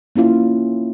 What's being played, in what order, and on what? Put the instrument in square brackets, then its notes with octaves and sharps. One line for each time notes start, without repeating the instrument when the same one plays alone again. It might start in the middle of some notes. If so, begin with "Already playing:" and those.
[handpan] A#3 C#4 E4 F4